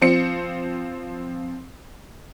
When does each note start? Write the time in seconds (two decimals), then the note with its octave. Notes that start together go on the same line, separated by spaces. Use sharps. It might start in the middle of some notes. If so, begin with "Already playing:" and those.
0.02 F3 C4 C#7